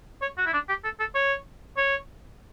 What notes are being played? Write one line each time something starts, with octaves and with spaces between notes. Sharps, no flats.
C#5
F#4
E4
D4
G4
A4
A4
C#5
C#5